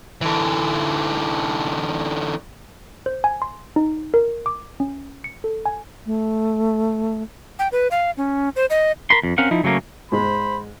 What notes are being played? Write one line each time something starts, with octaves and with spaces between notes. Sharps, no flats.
D3 E3
C5
G#5
C6
D#4
A#4
D6
C#4
C#7
A4
G#5
A3
G5
B4
F5
C#4
C5
D#5
A#4 B5 C6
F2
C4 C#4 A#4 F5 F#5
F3 D#4 E4
C#3 F#3 A3 A#3 C#4
G#2 G#3 C5 B5